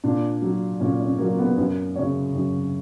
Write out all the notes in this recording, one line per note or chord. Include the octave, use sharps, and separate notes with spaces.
A#2 D4
F#3
A#2 C#4
C#4
F#3 A#3
B3
F#2 A#4
C#3 F#3 C#5
F#2